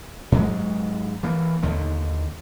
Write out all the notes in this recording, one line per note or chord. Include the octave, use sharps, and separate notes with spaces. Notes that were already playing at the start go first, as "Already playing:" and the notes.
G#2 F#3 G#3
E3 A#3
D#2 D3 D#3